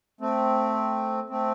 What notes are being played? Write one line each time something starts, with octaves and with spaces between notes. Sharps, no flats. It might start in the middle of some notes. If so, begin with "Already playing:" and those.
A3 C4
A3 C4